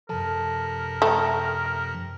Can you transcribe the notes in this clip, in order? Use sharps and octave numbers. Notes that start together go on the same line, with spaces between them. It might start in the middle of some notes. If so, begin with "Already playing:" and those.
F#2 C3 F3 A4 A#4 A5
A3 G5 A#5 D#6